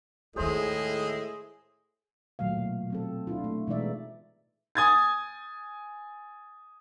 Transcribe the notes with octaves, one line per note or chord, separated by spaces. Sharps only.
D#2 A2 D#3 G#3 E4 G#4 C5 D#5
A#2 D#3 F#3 A3 F5
B2
F#3 C4 A4
D4 E4 F4
A3
B2 E3 G#3 D#4 D5 E5
G#5 D#6 G#6 A6